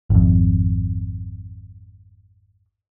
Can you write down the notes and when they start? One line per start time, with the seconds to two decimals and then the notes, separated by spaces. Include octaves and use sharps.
0.10 G#1 F2